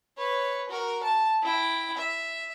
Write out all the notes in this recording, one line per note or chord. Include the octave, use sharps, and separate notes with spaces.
B4 C#5
F#4 A#4
A5
E4 G5
E5